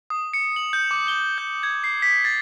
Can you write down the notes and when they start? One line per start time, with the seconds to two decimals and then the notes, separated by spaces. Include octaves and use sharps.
0.10 D#6
0.33 C#7
0.56 F#7
0.73 G6
0.91 D6
1.08 G7
1.38 G6
1.63 G#6
1.84 C7
2.02 B6
2.25 A6